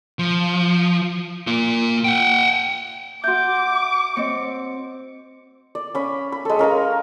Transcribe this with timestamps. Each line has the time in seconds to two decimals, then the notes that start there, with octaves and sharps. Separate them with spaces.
0.19 F3
1.47 A#3 F4
2.04 F#5 G5
3.24 F#4 E5 C6 D6 G6
4.17 C4 C#5 D#5 C#7
5.75 D5
5.95 C#4 B5
6.32 B5
6.45 G#3 A4
6.59 C#4 A#4 F5 A#5